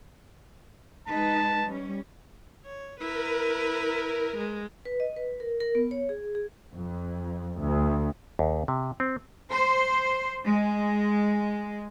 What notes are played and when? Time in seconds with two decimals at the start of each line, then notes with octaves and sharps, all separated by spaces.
1.08 G#3 D#4 B4 A5
1.65 G3 C#4
2.66 C#5
3.00 E4 A#4 B4
4.37 G#3
4.85 B4
5.00 D#5
5.16 B4
5.40 A#4
5.60 A#4
5.75 B3
5.91 C#5
6.09 G#4
6.35 G#4
6.71 F2
7.59 D2
8.39 D#2
8.68 C3
9.00 C4
9.51 C5
10.45 G#3